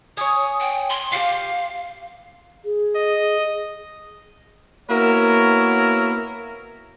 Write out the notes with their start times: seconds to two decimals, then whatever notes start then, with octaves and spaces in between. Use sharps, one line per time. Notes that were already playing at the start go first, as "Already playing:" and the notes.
0.17 C#5 G#5 D#6
0.60 G5
0.89 C6
1.12 F4 G4 F5
2.65 G#4
2.96 D#5
4.90 A#3 B3 E4 F#4 A#4 C#5